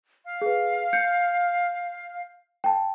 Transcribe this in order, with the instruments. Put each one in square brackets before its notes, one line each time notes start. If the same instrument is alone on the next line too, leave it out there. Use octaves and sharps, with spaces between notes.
[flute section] F5
[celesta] G#4 B4
G6 C#7
G5 A5